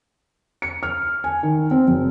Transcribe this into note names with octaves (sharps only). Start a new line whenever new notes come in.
C#7
F6
G#5
D#3
C4
F#1